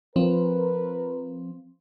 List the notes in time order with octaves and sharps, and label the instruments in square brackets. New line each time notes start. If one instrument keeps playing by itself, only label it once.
[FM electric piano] F3 C4 [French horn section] A#4 B4